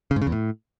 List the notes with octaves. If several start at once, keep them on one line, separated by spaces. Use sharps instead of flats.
C#3
G#2
C#3
E2
A2